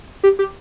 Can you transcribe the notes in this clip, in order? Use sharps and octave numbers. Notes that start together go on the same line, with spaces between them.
G4
G4